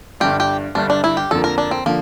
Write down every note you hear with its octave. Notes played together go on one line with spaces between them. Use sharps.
G1 G2 D3 G3 G4
G4
G1 G2 D3 G3 D4
D4
E4
G4
F2 D3 F3 A#3 A4
A#4
D4
C4
D3 F3 A#3